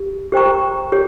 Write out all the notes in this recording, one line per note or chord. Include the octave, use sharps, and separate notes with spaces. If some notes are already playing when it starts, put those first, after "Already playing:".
Already playing: G4
G4 C5 G5 A#5 C#6
G4 C#5